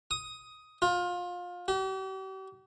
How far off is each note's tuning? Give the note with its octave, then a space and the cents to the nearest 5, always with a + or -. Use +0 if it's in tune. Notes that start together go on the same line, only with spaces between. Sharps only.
D#6 +10
F4 +25
G4 -45